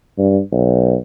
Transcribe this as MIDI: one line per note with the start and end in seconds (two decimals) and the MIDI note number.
0.18 0.40 43
0.52 0.96 35